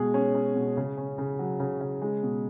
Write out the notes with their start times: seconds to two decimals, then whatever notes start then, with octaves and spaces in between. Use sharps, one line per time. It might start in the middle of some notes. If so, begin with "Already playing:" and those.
Already playing: B2 G#3 G#4
0.14 C#4
0.35 C#4
0.56 B2
0.77 C#3
0.97 C#4
1.18 C#3
1.39 F#3
1.60 C#3
1.81 C#3
2.02 G#3
2.23 B2